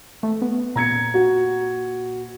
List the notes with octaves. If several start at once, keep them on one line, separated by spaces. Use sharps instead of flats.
A3
B3
A#2 A#5 G#6 C#7
F#4